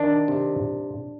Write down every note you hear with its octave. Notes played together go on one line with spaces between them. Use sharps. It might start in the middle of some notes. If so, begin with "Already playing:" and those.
Already playing: D#3 D4
C3